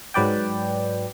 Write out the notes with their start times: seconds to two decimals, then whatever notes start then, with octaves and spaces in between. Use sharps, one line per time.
0.14 G#2 F#3 B4 D5 G5